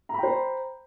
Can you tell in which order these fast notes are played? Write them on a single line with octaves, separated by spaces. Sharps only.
A#5 B5 G5 C5